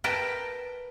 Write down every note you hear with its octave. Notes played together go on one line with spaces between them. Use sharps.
A#4 B4 G5 A5